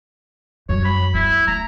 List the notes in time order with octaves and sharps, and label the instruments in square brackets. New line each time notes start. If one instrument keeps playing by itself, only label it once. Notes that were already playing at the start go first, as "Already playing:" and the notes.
[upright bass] F#2 G3 [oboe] C#5
[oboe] B5
[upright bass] B3 [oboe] E4
[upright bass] A3 [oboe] A#5